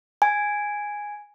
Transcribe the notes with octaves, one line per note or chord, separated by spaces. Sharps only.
G#5